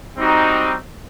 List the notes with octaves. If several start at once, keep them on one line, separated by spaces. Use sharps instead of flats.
G3 C4 D#4 F#4